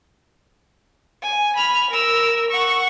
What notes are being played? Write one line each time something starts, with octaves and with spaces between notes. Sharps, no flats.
G#5
B5 F6
A#4 E6
F#5 C#6